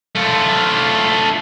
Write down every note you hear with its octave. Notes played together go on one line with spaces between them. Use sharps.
A3 F4